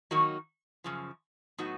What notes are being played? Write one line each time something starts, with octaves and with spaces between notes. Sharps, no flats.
D#3 F#3 A#3 D#4 F#4
F#2 C#3 F3
A2 F#3 B3 D#4 F#4